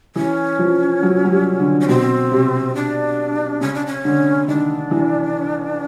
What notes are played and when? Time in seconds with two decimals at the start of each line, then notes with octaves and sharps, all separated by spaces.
0.16 E3 C#4
0.59 F3
1.03 F#3
1.25 F#3
1.31 G3
1.59 D3
1.80 C#4
1.88 B2 C4
2.32 C3
2.75 D4
3.61 C#3 C#4
3.74 D4
3.86 C#4
4.05 D3
4.48 D#3 D4
4.91 E3